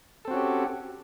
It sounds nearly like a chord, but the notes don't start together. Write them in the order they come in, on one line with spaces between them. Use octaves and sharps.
A4 C4 F#4 C#4 G4